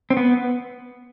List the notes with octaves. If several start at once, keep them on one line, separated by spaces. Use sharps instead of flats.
C4
B3